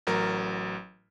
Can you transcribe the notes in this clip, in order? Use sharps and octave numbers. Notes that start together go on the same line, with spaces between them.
A1 F#3 A#4